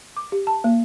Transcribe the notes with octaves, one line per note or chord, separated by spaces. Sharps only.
D6
G4
A5
A#3